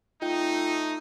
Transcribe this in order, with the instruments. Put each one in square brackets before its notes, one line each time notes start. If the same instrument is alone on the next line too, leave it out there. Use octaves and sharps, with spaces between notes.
[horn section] A3 D#4 [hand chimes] F4 G5